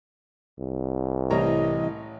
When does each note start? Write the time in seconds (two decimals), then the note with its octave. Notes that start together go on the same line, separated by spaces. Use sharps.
0.59 C2
1.30 A1 C3 E3 G3 C#5 D#5 A#5